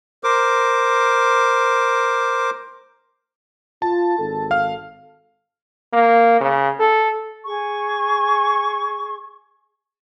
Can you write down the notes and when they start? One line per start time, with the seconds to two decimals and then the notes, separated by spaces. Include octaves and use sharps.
0.24 A#4 C5 D6
3.82 F4 A5
4.18 G#1 A4
4.51 F5 F6
5.93 A#3
6.40 C#3
6.79 A4
7.45 G#4 C#6